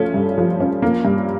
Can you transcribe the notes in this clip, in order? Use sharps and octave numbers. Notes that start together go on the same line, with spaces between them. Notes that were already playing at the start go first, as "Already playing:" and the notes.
Already playing: F3 A3 C#4
G2
F3
C#4
A#3
G2